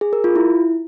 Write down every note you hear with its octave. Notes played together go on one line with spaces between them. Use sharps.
G#4
A#4
F4
E4